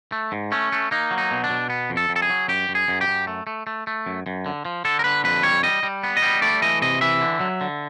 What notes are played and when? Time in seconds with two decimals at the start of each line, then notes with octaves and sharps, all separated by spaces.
0.12 A3
0.32 G#2
0.52 A3 C#4
0.72 A3
0.91 A#3 D#4
1.11 F#3
1.18 D#4
1.31 B2
1.44 D4
1.50 B2
1.70 B3
1.90 F2
1.97 A4
2.09 F2
2.16 A4
2.22 G#4
2.30 F#3
2.48 F#2 G4
2.69 F#2
2.75 G#4
2.88 F#2
3.01 G4
3.08 F#2
3.27 A3
3.47 A3
3.67 A3
3.87 A3
4.06 F#2
4.26 F#2
4.46 D3
4.65 F3
4.85 D3 A4
4.99 A#4
5.04 D3 B4
5.24 F2 B4
5.43 G3 C#5
5.63 G3 D#5
5.83 G3
6.04 B3
6.17 D#5
6.22 G3
6.42 A3 D5
6.62 E3 D#5
6.82 C3 D#5
7.01 E3 E5
7.21 D3
7.40 F#3
7.61 D3